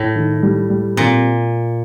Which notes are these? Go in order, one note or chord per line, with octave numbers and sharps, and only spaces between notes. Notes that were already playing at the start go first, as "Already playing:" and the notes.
Already playing: A2 E4
D#3
G3
G3
A#2 C4